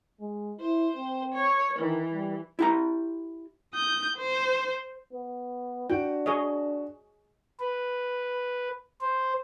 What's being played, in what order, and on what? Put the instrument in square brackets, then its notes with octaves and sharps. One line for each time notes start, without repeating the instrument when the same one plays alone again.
[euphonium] G#3
[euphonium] E4 [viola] C5
[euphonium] C4
[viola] C#5
[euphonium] D#3 [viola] E3
[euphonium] G3
[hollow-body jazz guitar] E4 G4 A#5
[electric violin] D#6 G6
C5
[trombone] B3
[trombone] D4 [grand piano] F#4 [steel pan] G5
[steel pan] G#4 C#5 D#5
[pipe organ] B4
C5